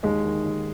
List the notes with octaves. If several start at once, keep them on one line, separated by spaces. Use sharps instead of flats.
D#2 G#3
D#3
D#2